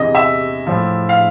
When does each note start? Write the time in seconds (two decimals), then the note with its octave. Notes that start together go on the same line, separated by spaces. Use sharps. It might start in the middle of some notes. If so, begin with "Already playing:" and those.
Already playing: E2 C3 E3 D#5
0.15 E5
0.67 A2 F3
1.09 F5